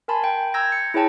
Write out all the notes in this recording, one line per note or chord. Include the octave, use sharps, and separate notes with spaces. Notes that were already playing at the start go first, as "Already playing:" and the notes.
A#4 G#5 A5 B5 C6
G5
A#5 E6 G6 G#6 A#6
C#7
E4 G#4 C#5 G5 A5